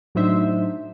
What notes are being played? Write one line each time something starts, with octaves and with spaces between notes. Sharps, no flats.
A2 F#3 D4 D#4 C5 E5